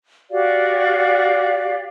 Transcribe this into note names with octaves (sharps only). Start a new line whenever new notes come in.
F#4 G4 D5 F5